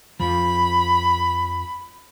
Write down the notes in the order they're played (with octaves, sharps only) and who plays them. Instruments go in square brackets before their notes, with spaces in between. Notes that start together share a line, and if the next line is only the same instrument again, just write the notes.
[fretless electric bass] F2 F3 [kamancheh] B5